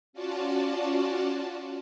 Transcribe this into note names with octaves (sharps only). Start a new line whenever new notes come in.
C#4 F4 F#4 D5 A5